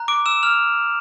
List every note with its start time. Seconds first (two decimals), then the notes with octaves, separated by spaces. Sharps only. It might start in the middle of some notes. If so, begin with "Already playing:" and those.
Already playing: A#5 F#6
0.08 D6 D7
0.26 E6 E7
0.43 F6 F7